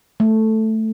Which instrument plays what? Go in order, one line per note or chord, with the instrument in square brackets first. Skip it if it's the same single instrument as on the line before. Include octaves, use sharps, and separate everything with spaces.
[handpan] A3